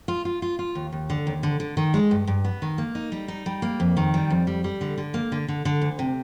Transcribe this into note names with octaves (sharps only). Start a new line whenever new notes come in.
F4
F4
F4
F4
D#2
D#2
D3
D#2
D3
D3
D#3
G#3
G2
G2
B3
D#3
A#3
D#4
G3
D#4
G3
A#3
F2
D#3
G3
F2
G3
G3
D3
D3
A#3
D3
D3
D3
D2
C3